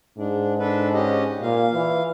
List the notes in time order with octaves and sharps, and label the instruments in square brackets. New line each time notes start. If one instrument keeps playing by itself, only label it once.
[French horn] G#2 [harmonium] D4
[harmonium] D4 A4 B4
C#4 G4 D#5
[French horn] A#2 [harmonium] F5
[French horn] E3